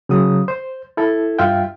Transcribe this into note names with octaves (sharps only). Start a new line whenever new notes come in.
C#3 F#3 D#6
C5
E4 A4
G2 F4 E5 F5 G5